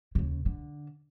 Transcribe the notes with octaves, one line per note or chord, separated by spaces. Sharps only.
D#2 C#3
D3